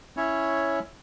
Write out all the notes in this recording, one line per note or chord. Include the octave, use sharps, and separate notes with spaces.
C#4 E4 C#5